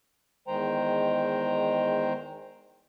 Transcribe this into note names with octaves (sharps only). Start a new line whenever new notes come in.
E2 D#3 G#3 C5 G5 A#5